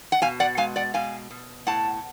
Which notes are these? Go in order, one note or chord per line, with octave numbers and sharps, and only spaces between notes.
F#5
B2 F5 G#5
D5 F#5
G#3 F5 G#5
D5 F#5
B2 F5 G#5
B2
A2 F#5 A5